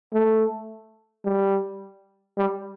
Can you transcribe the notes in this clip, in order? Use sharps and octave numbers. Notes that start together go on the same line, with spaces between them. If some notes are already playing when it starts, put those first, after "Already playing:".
A3
G3
G3